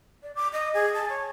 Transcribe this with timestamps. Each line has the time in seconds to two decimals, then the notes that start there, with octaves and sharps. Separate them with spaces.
0.23 D5
0.36 D6
0.53 D#5
0.74 G#4
0.94 A5
1.09 C#5